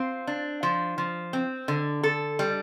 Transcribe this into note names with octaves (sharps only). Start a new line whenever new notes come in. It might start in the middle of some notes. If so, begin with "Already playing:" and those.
Already playing: C4 F4
D4
F3
F3
C4
D3
A4
G3